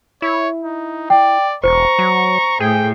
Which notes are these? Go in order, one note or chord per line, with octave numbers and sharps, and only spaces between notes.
E4 C#5
D#4
D5 G5
E1 C5 A#5 C#6
F#3
A2 G#4 G5